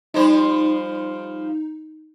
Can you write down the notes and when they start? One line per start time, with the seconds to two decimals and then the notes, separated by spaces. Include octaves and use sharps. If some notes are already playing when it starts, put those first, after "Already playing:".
0.14 F3 G3 D#4 C5